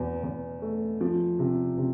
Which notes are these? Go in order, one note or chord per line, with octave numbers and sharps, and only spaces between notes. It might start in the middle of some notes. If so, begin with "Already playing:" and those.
Already playing: E2 B2
E2
A3
F3
C3
C3